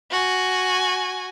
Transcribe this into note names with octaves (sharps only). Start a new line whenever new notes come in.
F#4 G#5